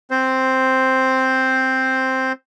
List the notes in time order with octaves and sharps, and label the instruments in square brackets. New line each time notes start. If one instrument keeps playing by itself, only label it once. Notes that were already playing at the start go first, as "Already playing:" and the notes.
[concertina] C4 C5